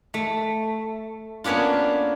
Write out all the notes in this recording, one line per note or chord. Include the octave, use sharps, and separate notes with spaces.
A3
A#3 B3 C#4 D4 F4